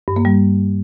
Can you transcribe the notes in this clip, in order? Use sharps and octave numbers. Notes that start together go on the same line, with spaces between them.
G2
A#3
G3